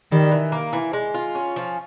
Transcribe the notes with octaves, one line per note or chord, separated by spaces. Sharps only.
D#3 G3
E3
A#3
E3
G#3
F4
C#4
F3